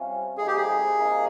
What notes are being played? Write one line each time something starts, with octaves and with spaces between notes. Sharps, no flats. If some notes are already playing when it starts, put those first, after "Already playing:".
Already playing: C3 G3 C#4 F4
F2 C3 G3 A#3 D#4 G#4
G4
G#4
C3 F3 A#3 D#4